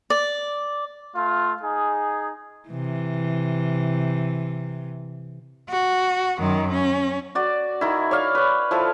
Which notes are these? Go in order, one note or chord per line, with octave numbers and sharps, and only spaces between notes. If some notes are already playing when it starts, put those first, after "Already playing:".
D5
A3 F4
D#4 G#4
C3 E3
F#4
F#2 D#3
C#4
F#4 D5
D#3 E4
C#5 D5 F5
B4 C#5
F3 E4 A4 F5